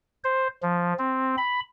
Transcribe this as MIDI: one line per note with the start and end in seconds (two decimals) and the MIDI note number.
0.24 0.48 72
0.62 0.93 53
0.99 1.36 60
1.38 1.60 83